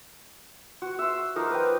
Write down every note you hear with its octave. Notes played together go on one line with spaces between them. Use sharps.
F#4
E5 C6
F3 D#4 A#4 D6
B4 G5